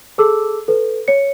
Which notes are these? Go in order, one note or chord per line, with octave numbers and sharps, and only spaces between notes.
G#4 A4 A5 D6 E6
A4 B4
C#5 C#7